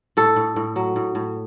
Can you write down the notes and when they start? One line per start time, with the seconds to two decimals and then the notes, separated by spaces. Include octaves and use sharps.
0.17 A2 A4
0.36 A2
0.56 A2
0.76 F#3
0.96 A2
1.15 A2